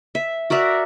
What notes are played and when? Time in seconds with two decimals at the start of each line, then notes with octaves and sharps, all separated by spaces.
0.15 E5
0.50 F#4 A#4 D5 E5